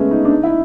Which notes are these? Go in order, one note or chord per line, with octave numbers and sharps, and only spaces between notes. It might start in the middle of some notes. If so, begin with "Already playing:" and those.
Already playing: G#3 A3 B3 C#4
D#4
D4
D#4
E4